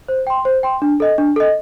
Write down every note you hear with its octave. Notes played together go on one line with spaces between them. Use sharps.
C5
G5 C6
C5
G5 C6
D4
A4 D#5
D4
A4 D#5